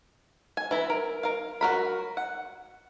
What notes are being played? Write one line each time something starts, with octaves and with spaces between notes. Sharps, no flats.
G#5
E3 E4 B5
A#4
A#4 F5
F#3 F#4 A#4 B5
F#5